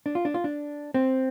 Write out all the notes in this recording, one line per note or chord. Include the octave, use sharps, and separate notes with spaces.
D4
F4
D4
F4
D4
C4